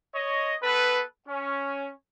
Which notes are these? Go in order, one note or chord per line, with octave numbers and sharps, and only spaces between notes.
C#5 D#5
B3 A4 B4
C#4